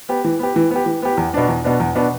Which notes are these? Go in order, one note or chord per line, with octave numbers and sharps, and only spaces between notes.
B3 G4
E3
B3 G4
E3
B3 G4
E3
B3 G4
E2
B2 B3 D4
E2
B2 B3 D4
E2
B2 B3 D4